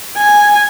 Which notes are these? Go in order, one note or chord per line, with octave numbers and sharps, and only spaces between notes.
G#5